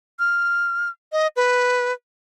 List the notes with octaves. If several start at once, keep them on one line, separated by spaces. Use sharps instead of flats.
F6
D#5
B4